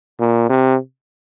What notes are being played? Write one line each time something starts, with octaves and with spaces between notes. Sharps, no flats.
A#2
C3